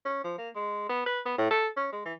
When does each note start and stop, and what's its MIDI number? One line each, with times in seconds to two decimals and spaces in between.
0.05 0.22 61
0.24 0.34 53
0.38 0.49 58
0.55 0.88 56
0.89 1.03 59
1.06 1.20 71
1.25 1.38 59
1.38 1.46 45
1.51 1.67 69
1.77 1.88 61
1.92 2.01 56
2.05 2.13 52